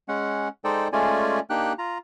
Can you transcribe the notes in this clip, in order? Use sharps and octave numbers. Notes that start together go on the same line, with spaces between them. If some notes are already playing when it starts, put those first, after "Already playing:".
G#3 C#4 F#5
G#3 D#4 A4 C5 D5 G5
G#3 A3 C#4 F4 D5 G#5
A#3 D4 D#4 G4 G5 F#6
F4 A#5